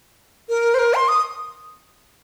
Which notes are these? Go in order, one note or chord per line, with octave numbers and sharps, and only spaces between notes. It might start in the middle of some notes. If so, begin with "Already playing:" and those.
A#4
C5
A#4
C6
D#6